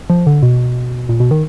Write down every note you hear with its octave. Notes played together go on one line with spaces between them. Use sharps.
F3
D3
B2
A#2
B2
D#3